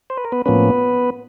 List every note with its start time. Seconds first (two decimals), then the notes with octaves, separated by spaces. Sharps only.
0.10 C5
0.17 B4
0.25 A#4
0.32 B3 B4
0.46 A2 F3 A#3 B3 C#4 B4